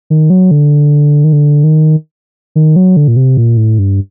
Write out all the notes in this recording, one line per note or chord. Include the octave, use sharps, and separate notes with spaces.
D#3
F#3
D3
D#3
D3
D#3
D#3
F#3
D3
A#2
C3
A#2
A2
G2